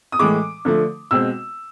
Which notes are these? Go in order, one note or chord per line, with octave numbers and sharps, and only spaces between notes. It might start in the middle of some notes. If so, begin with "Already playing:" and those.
D#6
A2 E3 G#3 D6
D3 F3 A3
B2 G#3 C4 E6